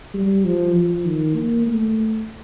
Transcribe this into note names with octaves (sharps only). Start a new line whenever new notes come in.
G3
F3
F3
D#3
A#3
A3